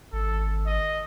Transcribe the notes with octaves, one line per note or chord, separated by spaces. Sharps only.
G#1 A4
D#5